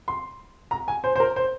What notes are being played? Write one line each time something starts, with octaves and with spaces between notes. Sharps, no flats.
C6
A#5
G#5
C5
C5
A#4
C5